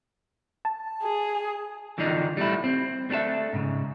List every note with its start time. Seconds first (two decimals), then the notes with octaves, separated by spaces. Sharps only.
0.65 A5
1.03 G#4
1.98 D3 E3 F3 D4 D#4
2.37 G3 A3 E4
2.64 C4
3.10 A3 D4 G4 A4 E5
3.53 G#2 C#3